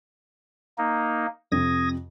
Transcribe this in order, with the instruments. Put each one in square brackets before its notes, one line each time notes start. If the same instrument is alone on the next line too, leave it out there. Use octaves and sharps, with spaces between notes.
[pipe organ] A#3 D#4
[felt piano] F2 C3 [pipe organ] D#6 G#6 A#6